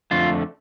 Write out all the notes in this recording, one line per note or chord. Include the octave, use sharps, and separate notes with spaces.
F2 D3 A3 F4